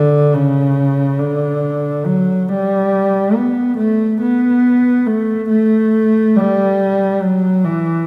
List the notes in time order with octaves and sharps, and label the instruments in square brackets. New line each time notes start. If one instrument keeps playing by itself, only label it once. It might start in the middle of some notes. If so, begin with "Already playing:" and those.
Already playing: [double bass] D3
C#3
D3
F#3
G3
B3
A3
B3
A3
A3
G3
F#3
E3